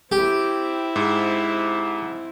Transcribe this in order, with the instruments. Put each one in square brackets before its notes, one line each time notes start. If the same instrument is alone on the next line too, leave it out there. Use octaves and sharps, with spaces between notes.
[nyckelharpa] C4 E4 [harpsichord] G4
[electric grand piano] G#2